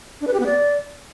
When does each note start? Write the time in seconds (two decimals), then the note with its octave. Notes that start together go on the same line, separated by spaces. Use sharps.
0.21 D4
0.27 B4
0.34 G4
0.40 B3
0.46 D5